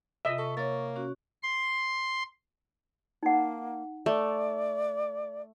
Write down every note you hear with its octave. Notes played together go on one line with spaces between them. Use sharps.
C3 F4 D#5 E5
A4 C#6
A#3 C#5 A6
C#4 F#4
C6
A#3 D#4 F#5
A3 D5